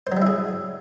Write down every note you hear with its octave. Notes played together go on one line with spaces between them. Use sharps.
F#3 G3 E4 G#4 C5